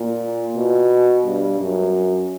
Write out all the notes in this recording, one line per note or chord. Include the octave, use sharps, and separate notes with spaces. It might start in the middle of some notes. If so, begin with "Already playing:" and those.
Already playing: A#2
B2
G2
F#2